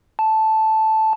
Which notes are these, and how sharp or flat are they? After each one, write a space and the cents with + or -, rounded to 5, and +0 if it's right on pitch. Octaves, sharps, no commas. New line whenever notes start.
A5 -5